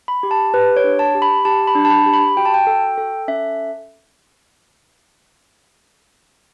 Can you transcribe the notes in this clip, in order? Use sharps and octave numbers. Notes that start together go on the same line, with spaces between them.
B5
G4
A5
G4 B4
C#5
D4
A5
G4
B5
G4 A5
B5
D4
A5
B5
G4
B5
F#4 G5
A5
G5
A4
A4
C#4 E5